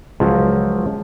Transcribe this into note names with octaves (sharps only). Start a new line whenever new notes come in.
C#2 F3 F#3